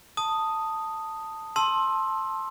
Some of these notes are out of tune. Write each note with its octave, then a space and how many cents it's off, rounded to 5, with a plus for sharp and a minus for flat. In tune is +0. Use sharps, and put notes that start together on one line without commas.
A5 +10 D#6 +0
A5 +0 C6 +20 E6 +0